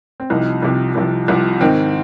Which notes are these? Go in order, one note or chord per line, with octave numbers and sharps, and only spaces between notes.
C4
C2 C3 F3 D#4
C2 C3 F3
C2 C3 F3
C2 C3 F3
G#2 D#3 C4